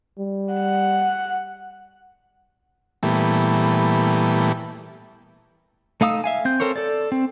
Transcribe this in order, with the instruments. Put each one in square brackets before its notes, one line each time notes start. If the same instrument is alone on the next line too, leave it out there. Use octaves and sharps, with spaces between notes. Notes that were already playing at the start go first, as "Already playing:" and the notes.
[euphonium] G3
[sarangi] F#5
[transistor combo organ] A#2 E3 G3 A3 B3
[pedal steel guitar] A3 D#4 F5 D#6 E6
E5 F5 G#5
C4 G6
C4 A4 A#4 C5 C#5
A4 D5
C4